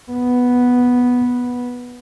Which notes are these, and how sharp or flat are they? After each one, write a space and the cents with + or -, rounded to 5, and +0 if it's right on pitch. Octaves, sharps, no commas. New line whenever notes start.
B3 -5